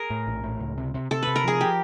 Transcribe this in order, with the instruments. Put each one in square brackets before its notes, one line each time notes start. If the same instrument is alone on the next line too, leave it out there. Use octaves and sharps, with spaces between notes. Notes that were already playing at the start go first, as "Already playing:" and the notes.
Already playing: [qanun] G#4 A#4
[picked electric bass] A2
A#1
A2
C#2
C3
C3
[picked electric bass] C3 [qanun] A4
[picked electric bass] C3 [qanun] B4
[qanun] A#4
[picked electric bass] F3 [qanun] G#4
[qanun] G4